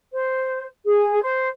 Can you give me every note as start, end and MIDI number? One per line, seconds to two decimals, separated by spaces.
0.13 0.66 72
0.86 1.22 68
1.23 1.47 72